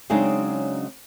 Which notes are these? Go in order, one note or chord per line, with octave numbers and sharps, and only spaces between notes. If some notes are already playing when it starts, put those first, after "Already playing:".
C#3 F#3 G#3 C4 D4 D#4